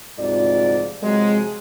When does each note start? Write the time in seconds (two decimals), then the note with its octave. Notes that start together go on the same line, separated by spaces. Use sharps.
0.18 D2 G#2 C3 F3 F4 D5
1.02 C3 F3 F#3 G#3